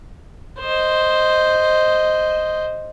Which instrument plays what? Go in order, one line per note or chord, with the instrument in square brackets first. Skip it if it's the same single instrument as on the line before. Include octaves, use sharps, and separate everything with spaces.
[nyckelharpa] C5 D#5